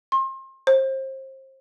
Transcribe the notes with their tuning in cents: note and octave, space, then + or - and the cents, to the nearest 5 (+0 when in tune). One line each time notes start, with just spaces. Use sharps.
C6 +35
C5 +30